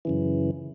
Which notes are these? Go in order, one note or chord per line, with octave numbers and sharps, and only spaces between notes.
F#2 C#3 E3